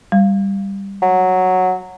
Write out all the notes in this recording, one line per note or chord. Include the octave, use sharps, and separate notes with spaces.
G3
F#3